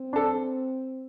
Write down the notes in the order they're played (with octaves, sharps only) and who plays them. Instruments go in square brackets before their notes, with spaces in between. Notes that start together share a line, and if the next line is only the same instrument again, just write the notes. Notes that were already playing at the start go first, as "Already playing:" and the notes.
Already playing: [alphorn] C4
[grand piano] D4 A4